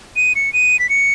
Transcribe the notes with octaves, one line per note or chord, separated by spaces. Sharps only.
D#7
C#7
D#7
B6
C#7